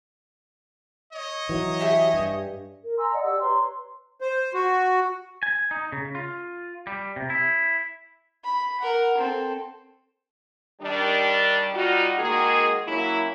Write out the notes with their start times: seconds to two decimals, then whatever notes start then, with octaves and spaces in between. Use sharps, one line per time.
1.13 C#5 D#5
1.49 E3 F#3
1.79 G4 E5 G#5
2.14 G2
2.82 A#4
2.97 G#5 A#5 C6 E6
3.12 D5 D#5 F#5
3.23 G4 D5 E6
3.41 B4 C#5 A#5 C6
4.21 C5
4.54 F#4
5.43 G#5
5.71 D#4
5.92 C#3
6.15 F4
6.87 G3
7.16 C3
7.30 E4
8.44 B5
8.80 A#4 F#5
9.17 C4 A4
10.81 D#3 G3 D4
11.74 G3 D#4 F4 F#4
12.19 D#3 G#3 A#3 F#4 G#4
12.87 F#3 A#3 C#4 E4